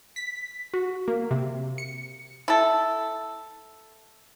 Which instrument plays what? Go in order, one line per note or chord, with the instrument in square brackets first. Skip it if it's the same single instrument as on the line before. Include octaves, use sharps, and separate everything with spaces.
[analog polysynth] B6
F#4
A#3
C3
C#7
[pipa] E4 A4